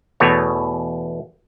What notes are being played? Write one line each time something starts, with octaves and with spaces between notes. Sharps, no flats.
E2 B2 A3 C#5